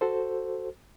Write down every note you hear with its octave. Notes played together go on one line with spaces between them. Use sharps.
F#4 A4 C5